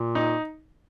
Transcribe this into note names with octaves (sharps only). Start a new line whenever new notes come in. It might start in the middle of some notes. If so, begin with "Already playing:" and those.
Already playing: A#2
D#4